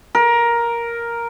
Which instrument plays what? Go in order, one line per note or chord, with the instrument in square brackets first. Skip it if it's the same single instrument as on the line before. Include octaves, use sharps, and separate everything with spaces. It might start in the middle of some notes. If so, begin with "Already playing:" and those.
[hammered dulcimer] A#4